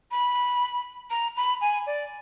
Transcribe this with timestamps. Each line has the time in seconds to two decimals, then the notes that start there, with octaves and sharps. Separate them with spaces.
0.11 B5
1.10 A#5
1.37 B5
1.61 G#5
1.87 D5